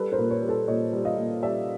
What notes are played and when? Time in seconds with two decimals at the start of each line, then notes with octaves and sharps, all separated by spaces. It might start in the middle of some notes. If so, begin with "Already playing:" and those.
Already playing: G3 A4 B4
0.12 A#4 C5
0.18 A#2
0.30 B4 C#5
0.42 G3
0.48 A4 B4
0.68 A#2 C#5 D#5
0.93 G3
1.05 D#5 F5
1.17 A#2
1.42 G3 D5 E5